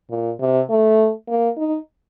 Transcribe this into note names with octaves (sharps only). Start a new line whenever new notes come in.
A#2
C3
A3
A#3
D#4